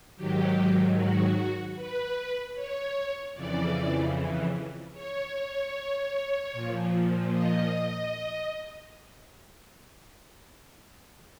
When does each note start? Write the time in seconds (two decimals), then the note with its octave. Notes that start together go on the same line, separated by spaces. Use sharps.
0.16 G#2 D#3 F#3 G4
0.96 F#4
1.76 B4
2.55 C#5
3.34 F2 C#3 E3 D5
4.93 C#5
6.53 A#2 F3
7.32 D#5